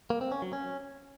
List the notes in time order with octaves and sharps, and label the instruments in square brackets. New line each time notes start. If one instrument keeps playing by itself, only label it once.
[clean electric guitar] A#3
C4
C#4
F#3
C#4